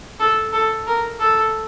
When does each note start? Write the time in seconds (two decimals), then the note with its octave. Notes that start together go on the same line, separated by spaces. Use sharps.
0.19 A4
0.53 A4
0.87 A#4
1.20 A4